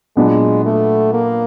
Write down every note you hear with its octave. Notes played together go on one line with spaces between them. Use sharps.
A#2 F#3 G#3 B3 D4
A3
A#3